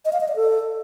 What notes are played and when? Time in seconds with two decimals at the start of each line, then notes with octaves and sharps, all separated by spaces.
0.05 D#5
0.13 F5
0.21 D#5
0.28 D5
0.36 A4